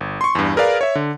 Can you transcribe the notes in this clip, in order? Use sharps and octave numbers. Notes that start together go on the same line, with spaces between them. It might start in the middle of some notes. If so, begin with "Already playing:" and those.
G1
C6 C#6
E2 G2
G#4 A#4 B4 D5 F5
C#5 E5
D3